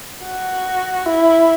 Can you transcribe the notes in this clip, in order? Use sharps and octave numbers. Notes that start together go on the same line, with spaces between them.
F#4
E4